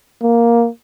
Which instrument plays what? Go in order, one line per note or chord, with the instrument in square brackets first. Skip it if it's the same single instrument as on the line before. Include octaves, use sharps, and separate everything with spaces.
[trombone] A#3